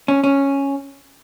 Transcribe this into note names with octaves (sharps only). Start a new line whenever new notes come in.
C#4
C#4